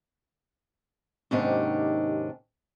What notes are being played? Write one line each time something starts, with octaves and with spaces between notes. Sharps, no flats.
D#2 G#2 C3 D#3 C#4 D4